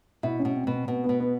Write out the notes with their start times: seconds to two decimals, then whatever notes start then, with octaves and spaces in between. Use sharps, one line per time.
0.23 B2 E4
0.39 C#4
0.45 B2
0.55 C4
0.67 B2 C4
0.88 B2 B3
1.04 B3
1.09 B2
1.20 B3